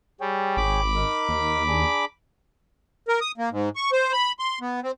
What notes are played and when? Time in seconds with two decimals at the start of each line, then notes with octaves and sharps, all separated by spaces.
0.21 G3 G#4 C#5 G5
0.57 G#1 B5 D6
0.95 D#4 A#4
1.29 D#2
1.68 D4 G#4 A#5
3.08 A#4
3.21 D#6
3.38 A#3
3.50 G#2
3.76 C#6
3.92 C5
4.13 B5
4.39 C6
4.61 B3
4.83 C4